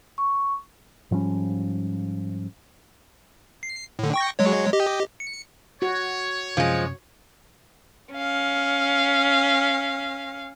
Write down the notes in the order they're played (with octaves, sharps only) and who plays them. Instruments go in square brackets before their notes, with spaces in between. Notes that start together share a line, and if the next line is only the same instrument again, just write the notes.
[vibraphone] C#6
[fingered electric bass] G#2 F3 G3 C#4
[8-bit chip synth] C7
A2 D3
G5 C#6 A#6
F#3 G#3 C#5
G4 D#5
C#7
[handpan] F#4 [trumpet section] C#5
[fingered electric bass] F#2 C3 C#4 [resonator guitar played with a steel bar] F3 G#3
[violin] C#4 F5